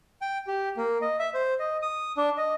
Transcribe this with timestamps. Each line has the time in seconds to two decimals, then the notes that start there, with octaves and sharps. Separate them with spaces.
0.22 G5
0.47 G4
0.77 A#3
1.02 D#5
1.19 E5
1.34 C5
1.59 D#5
1.82 D#6
2.17 D4
2.37 D#5